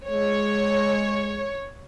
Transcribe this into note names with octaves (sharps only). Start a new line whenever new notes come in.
G#3 C#5